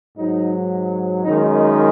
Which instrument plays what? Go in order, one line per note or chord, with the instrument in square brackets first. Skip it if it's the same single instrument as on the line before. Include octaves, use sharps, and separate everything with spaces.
[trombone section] G#2 F#3 D#4
F#2 D#3 G#3 D#4